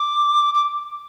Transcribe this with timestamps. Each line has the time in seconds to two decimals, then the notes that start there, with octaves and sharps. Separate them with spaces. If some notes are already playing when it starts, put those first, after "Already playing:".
Already playing: D6
0.54 D6